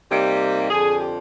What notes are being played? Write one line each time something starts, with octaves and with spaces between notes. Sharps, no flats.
C3 G3 A#3 D#4 G4
F2 D3 F3 G#4
G4